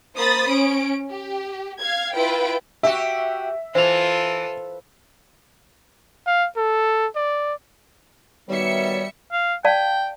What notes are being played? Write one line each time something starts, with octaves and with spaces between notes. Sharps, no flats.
A#3 C5 B5 D#6 A6
C#4 D7
G4
F5 G#6
E4 F4 B4 G5 D7
F#4 G4 E5
E3 F4 A4 C5 F7
F5
A4
D5
D#3 G3 B3 F#4 C#5 E5 C#7
F5
D5 F5 G5 A5